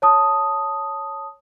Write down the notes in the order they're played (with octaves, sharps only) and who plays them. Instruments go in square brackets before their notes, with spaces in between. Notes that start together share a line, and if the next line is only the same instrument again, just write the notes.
[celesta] C#5 A5 D#6